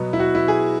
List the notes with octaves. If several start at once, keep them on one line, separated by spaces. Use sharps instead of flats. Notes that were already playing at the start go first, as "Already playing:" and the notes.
Already playing: B2 F#3 B3
E4
F#4
E4
G#4